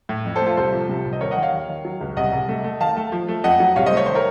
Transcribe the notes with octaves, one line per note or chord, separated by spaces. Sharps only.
A2
F2
A4 C5
A3
F4 A4
C2 A4 C5
F3
C3
C2
D#5
D#2 A#4 C#5
D#5 F#5
D#3
C#5 F5
D#2
D#3
F#3
C#2
C2 D#5 F#5
C2
A3
A3
D#3 F5 A5
A3
F3
A3
F2 D#5 F#5
F#3
C2 C#5 F5
C5 D#5
A3
C#5
D#3 C5
A#4 C#5